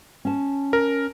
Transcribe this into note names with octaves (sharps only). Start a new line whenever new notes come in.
C#4 A5
A#4